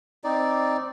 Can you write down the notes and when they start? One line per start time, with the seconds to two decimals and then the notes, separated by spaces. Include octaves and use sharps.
0.24 C4 D#4 D5